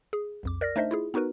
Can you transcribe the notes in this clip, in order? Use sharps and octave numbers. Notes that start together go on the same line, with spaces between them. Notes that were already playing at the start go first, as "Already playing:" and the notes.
G#4
B1 F2 D6
A#4 D5 F6 A#6
A3 D4 D#4 C5 D#5 E5
E4 F4 G#4
B3 D#4 F#4 A#4 B4